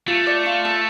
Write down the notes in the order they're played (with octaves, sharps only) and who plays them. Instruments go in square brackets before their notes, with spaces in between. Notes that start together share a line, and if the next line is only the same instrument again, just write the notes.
[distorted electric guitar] A3 [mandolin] F4
[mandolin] D5
F4
A4